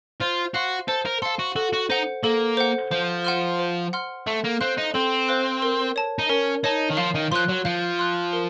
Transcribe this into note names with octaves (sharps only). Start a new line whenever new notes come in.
F4 C5
F#4 F5 C6
A4 C5
A#4
A4 F5 C6
F#4
F#4 A4
F#4
D#4 C5 F#5
A#3 A4
C5 F#5
F3 C5
F#5 C6 F6
C5
F#5 C6 F6
A3 A4
A#3
C4 C5 F5 C6 F#6
D#4
C4 A4
C5 F5 C6 F#6
A#4
C#5 A5
D#4
C#4 A#4
D#4 C#5 A5
D#3
F3 F5
D#3
F3 C6 F#6
F#3
F3 F5
C6 F#6
A#4